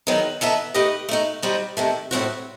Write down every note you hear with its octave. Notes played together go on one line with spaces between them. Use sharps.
E2 D#3 F#3 B3 D#4
E3 B3 D#4 A4 E5
A3 D#4 G4 B4 D#5
A3 D#4 F#4
G3 D#4 F#4 C5 D#5
C3 D#3 A3
A2 G3 C4 F#4